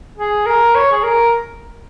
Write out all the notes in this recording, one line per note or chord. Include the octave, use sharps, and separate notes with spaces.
G#4
A#4
C#5
G#4
A#4